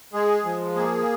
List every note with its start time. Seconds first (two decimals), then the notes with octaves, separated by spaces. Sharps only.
0.13 G#3 G#4
0.45 F3
0.76 A#3 G#4